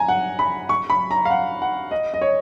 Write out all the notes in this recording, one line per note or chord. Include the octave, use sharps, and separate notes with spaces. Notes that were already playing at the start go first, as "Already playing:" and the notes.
Already playing: G#5 A#5
F#5
B5
C#6
B5
A#5
F5
F#5
F#5
D#5
D#5
C#5